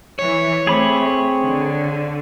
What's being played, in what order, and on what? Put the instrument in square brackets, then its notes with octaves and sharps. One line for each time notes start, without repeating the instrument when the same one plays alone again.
[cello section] E3 [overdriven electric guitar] C#5
[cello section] A3 [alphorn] C4 [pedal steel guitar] G#4 B5 D6
[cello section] D3